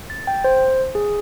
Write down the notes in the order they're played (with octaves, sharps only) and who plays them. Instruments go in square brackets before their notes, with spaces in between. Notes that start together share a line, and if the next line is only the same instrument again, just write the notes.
[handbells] A6
G5
C5
G#4